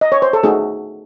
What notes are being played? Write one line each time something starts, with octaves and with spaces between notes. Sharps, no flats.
D#5
C#5
C5
A4
A3 D#4 F#4 G#4